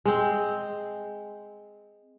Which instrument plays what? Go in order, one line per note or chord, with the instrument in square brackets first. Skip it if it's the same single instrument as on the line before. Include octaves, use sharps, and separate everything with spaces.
[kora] G#3 C4